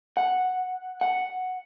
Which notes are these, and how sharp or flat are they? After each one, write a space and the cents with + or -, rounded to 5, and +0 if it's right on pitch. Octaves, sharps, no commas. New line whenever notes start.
F#5 -5
F#5 +0